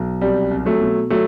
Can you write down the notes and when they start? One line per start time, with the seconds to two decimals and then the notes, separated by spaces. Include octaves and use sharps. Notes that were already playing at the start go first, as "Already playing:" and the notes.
Already playing: B1
0.21 C2 G3
0.51 C2
0.66 F#3 A3
0.81 B2
1.10 F#3 A3